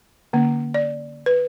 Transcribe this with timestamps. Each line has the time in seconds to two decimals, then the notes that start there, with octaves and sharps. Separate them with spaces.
0.33 D3 A#3 C#4
0.74 D5
1.26 B4